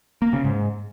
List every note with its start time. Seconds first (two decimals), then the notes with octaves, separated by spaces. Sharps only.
0.22 A#3
0.33 C#3
0.45 G#2